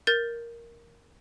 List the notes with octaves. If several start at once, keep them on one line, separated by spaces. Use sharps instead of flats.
A#4 G6 A6